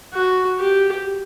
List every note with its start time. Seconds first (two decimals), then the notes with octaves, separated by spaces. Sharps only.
0.13 F#4
0.60 G4